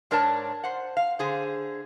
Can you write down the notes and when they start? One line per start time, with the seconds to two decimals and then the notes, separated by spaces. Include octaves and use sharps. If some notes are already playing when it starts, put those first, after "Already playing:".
0.11 G#2 D4 A#4 C#5 D5 A5
0.64 C5 F#5
0.97 F5
1.19 D3 G#4 C5